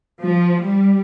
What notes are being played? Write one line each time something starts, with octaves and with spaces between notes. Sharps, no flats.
F3
G3